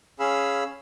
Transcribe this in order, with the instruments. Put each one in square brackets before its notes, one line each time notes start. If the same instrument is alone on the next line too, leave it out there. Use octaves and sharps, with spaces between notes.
[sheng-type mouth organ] C#4 G#4 F5 B5 E6